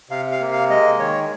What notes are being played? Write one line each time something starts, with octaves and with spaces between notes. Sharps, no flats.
C3 F5
F5
A#3
F5
G#3 D#5
D#3 C#5